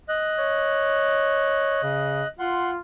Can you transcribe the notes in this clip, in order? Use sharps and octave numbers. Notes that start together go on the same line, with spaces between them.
D#5 F#6
C#5
C#3
F4 F#5 C6